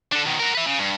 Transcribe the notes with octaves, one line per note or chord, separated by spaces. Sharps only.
D4 A4
B2 D#3
F#4 A#4
B4 E5
C#3
G2